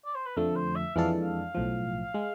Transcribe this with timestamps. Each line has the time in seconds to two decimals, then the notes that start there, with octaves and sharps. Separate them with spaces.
0.05 D5
0.15 C5
0.26 B4
0.37 F2 D3 F3 A3 A4
0.56 C5
0.76 E5
0.95 F2 E3 G#3 D4 A4 F5
1.22 F5
1.55 B1 A2 F3
2.14 G#3